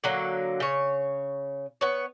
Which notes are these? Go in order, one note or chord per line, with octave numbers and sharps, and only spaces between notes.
D3 F#3 A#3
C#3 C#5
B3 C#5